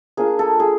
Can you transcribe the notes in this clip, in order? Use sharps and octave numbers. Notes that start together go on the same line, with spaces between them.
A#3 D4 F4 G#4
A4
G#4